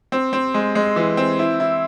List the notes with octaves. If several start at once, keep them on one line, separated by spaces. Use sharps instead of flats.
C4
C4
G#3
G#3
E3
C4
E4
E4